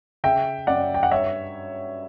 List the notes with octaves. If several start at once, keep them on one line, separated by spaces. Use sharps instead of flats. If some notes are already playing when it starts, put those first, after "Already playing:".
C#3 E5 G5
F#2 D5 F#5
G5
F#5
G2 C#5 E5